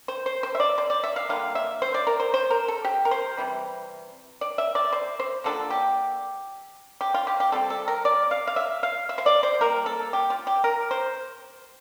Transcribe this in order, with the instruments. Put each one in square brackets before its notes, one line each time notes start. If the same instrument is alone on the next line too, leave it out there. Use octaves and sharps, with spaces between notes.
[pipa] C5
C5
C5
E5
D5
C5
D5
E5
F5
D3 G3 A#3 F4 F5
E5
C5
D5
A#4
C5
C5
A#4
A4
G4
A#4
C5
C3 E3 G3
D5
E5
D5
C5
C5
D3 F3 A#3 D4 A4
G4
G4
F4
G4
G4
G3 C4 F4 A4
A4
A#4
D5
F5
F5
E5
F5
E5
C5
D5
C5
G3 A#3 F4 A#4
A4
G4
F4
G4
A#4
C5